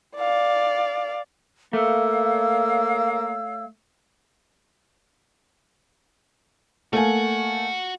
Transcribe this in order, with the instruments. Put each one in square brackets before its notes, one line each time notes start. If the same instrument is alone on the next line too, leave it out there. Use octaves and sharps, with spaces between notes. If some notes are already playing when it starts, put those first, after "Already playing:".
[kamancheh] D5 F5
[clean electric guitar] A3 [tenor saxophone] A#3 [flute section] C#5 F5 E6
[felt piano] A3 A#3 G#5 [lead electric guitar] F#4 F#5